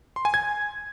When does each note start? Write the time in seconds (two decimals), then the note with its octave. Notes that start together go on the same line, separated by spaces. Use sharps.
0.16 C6
0.25 G#5
0.34 G#6